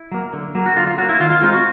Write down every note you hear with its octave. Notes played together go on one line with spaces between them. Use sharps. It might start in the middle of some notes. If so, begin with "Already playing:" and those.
Already playing: E4
F#3 A#3
D3
F#3 A#3
F#4
D3 F4
F4
F#3 A#3 F#4
E4
D#3 F4
F4
G#3 C4 D#4 F4
F#4